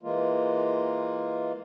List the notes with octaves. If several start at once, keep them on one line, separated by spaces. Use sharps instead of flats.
E3 G#3 A#3 F4